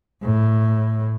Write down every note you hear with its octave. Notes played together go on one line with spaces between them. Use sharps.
A2